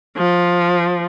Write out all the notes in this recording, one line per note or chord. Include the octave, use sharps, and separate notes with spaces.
F3